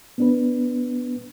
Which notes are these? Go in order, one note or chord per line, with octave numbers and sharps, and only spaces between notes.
B3 D4 B4